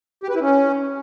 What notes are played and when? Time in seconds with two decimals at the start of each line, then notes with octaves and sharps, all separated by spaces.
0.23 G4
0.29 B4
0.35 E4
0.41 C#4